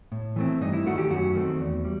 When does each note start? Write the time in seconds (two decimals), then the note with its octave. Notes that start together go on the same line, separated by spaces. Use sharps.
0.12 A2
0.36 E3 A3 C4
0.61 G2 D#4
0.73 E4
0.86 D#3 A3 F#4
0.98 G4
1.10 F#2 F#4
1.35 D#3 A3 C4
1.60 E2
1.84 G3